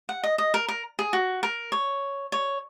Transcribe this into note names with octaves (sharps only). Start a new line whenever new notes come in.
F#5
D#5
D#5
A#4
A#4
G#4
F#4
A#4
C#5
C#5